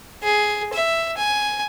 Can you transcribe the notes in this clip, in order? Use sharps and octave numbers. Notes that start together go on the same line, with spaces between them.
G#4
E5
G#5